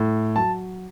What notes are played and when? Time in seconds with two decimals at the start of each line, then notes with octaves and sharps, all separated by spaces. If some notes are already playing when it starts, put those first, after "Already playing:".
Already playing: A2
0.36 F#3 A5